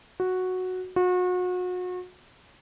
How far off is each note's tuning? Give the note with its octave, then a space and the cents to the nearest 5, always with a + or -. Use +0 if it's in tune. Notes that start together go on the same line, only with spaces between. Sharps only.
F#4 -5
F#4 -35